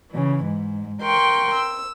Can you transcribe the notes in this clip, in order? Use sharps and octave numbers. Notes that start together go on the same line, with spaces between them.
C#3 E3
G#2
A#4 G5 C6 C#6
E6